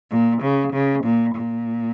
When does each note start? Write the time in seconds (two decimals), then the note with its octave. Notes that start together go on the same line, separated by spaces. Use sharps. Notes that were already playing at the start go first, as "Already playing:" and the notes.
0.11 A#2
0.42 C#3
0.73 C#3
1.04 A#2
1.35 A#2